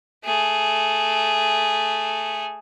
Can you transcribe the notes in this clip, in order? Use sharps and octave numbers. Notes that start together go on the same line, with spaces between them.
A3 G#4